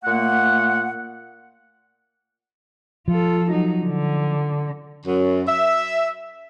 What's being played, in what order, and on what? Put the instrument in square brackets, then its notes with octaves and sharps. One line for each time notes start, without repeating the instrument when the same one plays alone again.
[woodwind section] A#2 A3 A#3 F#5
[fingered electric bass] F3 [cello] F4 A4
[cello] F#3 D#4
D3
[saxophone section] F#2
E5